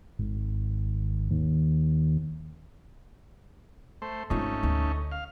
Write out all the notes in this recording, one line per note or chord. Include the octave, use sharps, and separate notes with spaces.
G#1
D#2
A3 C5
G#1 A3 C#4 D#4 F4
D2
F5